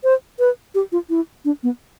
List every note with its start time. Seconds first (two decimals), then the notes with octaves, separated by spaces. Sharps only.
0.04 C5
0.39 B4
0.75 G4
0.92 F4
1.10 E4
1.45 D4
1.63 B3